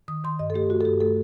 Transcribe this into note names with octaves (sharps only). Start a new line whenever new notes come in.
D#3 D#6
D#3 C6
G2 D#5
A4
A3 G4
A3 F#4
A4
G2 G4
A3 A4